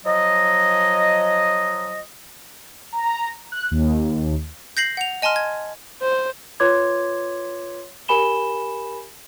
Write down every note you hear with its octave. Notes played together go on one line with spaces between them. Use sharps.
F3 F#3 D#5
A#5
F#6
D#2
G6 A#6 C7 F#7
F#5 F7
D#5 G#5 A5 C6 F6
G#6
C5
F4 B4 C#5 C6 D6 G#6
G4 A#4 G#5 B5 E7 G7